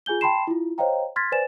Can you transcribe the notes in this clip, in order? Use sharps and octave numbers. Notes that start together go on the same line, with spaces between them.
F4 G#4 G#5 G6 G7
G5 A5 B5 C6 C7 E7
E4 F4
C5 C#5 D#5 F5 G5 A#5
C6 F6 G#6 A6 B6
B4 C5 D5 G#5 A6 E7